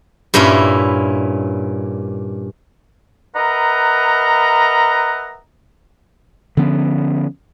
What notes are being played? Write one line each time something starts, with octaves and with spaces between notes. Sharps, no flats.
G2 A#2 A#3 C#4 E4
A#4 B4 D#5 E5 F#5 A#5
D3 F3 B3 C#4